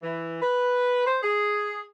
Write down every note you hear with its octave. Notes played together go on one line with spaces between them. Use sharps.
E3
B4
C5
G#4